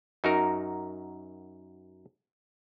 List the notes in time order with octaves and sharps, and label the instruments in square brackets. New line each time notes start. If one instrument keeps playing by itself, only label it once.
[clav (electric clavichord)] F#2 D#4 F#4 A#4